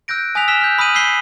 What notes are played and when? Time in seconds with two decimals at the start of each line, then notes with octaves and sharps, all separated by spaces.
0.08 E6 F#6 G6 A#6 D7
0.35 G#5 D#6 F#6 B6 F7
0.48 E6 F6 B6 E7 G7
0.61 F6 G6
0.78 B5 D#6 F6 G6 D#7 F#7
0.94 E6 G6 B6 C7 G7